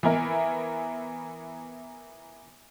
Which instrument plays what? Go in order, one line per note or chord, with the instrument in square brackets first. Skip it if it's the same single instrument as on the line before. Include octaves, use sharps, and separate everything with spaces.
[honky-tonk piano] E3 B3 E4 A#4